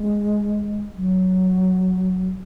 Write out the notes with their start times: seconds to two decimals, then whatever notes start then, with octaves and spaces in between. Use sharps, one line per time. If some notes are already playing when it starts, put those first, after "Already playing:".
Already playing: G#3
0.96 F#3